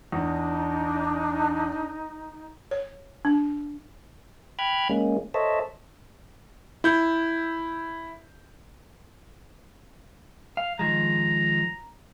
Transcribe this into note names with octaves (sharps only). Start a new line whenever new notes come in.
E2 D4 D#4
C#5
D4
G5 B5 F6 F#6 G#6
G#3 A#3 C#4
A4 C5 C#5 D#5 E5 A5
E4 G6
F5
D#3 F3 G#3 A#5